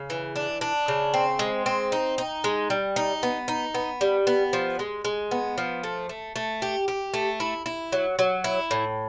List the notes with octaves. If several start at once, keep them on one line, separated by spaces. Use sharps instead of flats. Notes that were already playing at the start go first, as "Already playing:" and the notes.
Already playing: C#3
E3
D4
D4
C#3
C4
G#3
C4
D#4
D#4
G#3
G3
D#4
B3
D#4
B3
G3
B3
F3
G#3
G#3
B3
F3
A3
A3
A3
G4
G4
A3
E4
E4
F#3
F#3
E4
A2